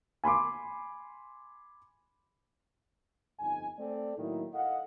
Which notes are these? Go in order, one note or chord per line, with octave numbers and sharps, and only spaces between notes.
G#5 B5 C6 D6
G1 F2 D#4 G#5
A3 C4 A4 D5
A2 D#3 F#3 A#3 D#4 E4
A4 D#5 F5 F#5